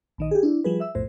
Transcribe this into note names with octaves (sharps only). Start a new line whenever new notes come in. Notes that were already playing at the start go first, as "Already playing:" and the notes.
A#1 D#3 D#5
G4 G#4
D4 E4
F3 G3 G#4 B4
E5 E6
B1 F2 A2 C5